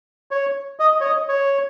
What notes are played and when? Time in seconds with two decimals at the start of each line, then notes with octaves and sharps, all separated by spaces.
0.31 C#5
0.79 D#5
1.01 C#5
1.05 D#5
1.29 C#5